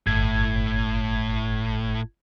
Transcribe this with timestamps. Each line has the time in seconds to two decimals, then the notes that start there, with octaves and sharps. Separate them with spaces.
0.07 G1 A2 G#6